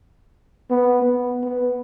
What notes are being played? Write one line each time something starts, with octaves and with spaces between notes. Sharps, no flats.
B3
B3
B3